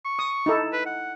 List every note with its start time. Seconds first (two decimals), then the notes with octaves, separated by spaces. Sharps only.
0.05 C#6
0.19 D#6
0.46 D#4 E4 A4
0.73 B4
0.86 F#5